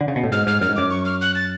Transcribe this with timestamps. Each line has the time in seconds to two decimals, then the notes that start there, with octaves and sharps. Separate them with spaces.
0.01 D3
0.08 C#3
0.16 B2
0.23 A2
0.32 G#2 F6
0.47 G#2 F6
0.61 F#2 F6
0.69 G#2
0.76 F#2 D6
0.91 C#6
1.05 F6
1.21 F#6
1.36 A6